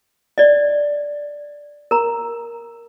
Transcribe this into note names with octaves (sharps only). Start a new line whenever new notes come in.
D5 D#5
A#4 A#5